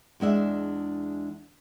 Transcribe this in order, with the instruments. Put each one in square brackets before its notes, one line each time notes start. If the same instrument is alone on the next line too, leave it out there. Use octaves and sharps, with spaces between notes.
[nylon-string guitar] E2 G#3 D4 E5